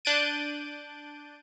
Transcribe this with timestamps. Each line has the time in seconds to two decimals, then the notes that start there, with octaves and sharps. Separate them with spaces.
0.05 D4 F#6 G6 A6 D7 D#7